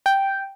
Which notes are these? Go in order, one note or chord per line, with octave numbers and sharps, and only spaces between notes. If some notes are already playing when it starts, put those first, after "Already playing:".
G5